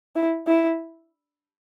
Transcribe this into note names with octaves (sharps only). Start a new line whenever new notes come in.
E4
E4